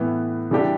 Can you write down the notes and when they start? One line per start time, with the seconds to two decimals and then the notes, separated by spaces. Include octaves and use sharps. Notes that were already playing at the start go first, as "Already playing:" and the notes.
Already playing: A2 E3 B3
0.51 E3 G3 D4 G4